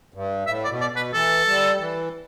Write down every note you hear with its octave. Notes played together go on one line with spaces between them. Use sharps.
G2
A2 E5
D5
B2
D5
B2 B4
E3 A4
G3
E3